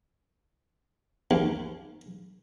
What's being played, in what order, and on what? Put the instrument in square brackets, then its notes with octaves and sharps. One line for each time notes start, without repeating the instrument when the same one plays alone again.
[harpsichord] D#2